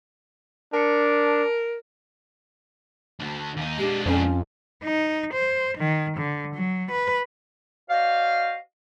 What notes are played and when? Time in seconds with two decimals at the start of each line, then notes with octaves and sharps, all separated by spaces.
0.74 D4 A#4 A5 C#7
3.20 D2 D3
3.57 D#2 D#4
3.78 G#3 D4 G4
4.06 F2 C#4
4.84 D#4
5.34 C5
5.78 D#3
6.17 D3
6.55 F#3
6.91 B4
7.90 F#4 C5 D5 D#5 F5